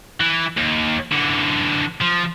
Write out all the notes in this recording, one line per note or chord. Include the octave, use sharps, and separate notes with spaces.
E3
D#2
D3 E3
F3